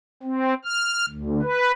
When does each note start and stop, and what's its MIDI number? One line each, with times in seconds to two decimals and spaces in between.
0.23 0.54 60
0.65 1.06 89
1.09 1.41 38
1.42 1.72 71